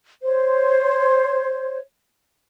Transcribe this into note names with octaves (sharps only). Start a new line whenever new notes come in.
C5 C#5